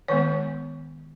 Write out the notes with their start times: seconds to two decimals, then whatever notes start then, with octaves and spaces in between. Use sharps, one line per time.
0.08 D#3 G#3 B3 C#5